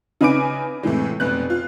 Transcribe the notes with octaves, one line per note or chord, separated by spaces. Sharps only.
C#3 D#4 B4 G#5 D6 D7
A2 C3 E3 G#3
F1 B2 B3 F#6
F4